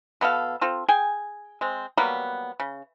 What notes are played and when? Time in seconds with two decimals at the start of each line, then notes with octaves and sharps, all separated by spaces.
0.21 B2 B3 A4 F5
0.61 C4 F4 A4
0.88 G#4 G5 G#5
1.61 G#3 C4
1.97 F#3 G3 A#3 B3
2.60 C#3